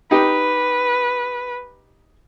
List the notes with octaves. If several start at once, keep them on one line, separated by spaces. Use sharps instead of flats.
D#4 G4 B4